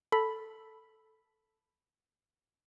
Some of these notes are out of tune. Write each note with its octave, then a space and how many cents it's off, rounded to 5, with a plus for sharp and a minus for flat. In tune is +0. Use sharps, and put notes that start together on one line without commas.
A4 +0 B5 +0